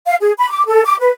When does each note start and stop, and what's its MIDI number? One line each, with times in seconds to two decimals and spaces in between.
0.06 0.15 77
0.20 0.32 68
0.38 0.50 83
0.50 0.63 86
0.67 0.82 69
0.85 0.95 86
1.01 1.11 71